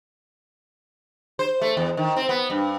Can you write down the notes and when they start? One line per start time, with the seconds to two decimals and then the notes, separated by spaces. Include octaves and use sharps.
1.39 C5
1.62 A3
1.77 E2
1.97 D#3
2.16 C4
2.29 B3
2.50 G2